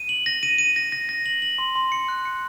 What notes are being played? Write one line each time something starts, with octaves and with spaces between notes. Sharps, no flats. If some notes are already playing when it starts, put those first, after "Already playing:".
Already playing: D#7
F#7
A#6
D#7
D#7
A#6
A#6
A#6
F#7
F#7
C6
C6
C#7
F#6
C#7